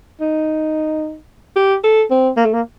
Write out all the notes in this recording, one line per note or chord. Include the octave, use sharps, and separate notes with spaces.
D#4
G4
A4
C4
A#3
A3
A#3